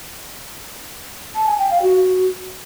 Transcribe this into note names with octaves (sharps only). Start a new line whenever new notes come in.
A5
G#5
G5
F5
F#4